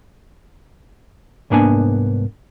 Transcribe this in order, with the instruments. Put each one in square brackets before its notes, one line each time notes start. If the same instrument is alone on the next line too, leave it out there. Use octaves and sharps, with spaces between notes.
[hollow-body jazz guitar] C2 G#2 A#3 B3 D4 G#5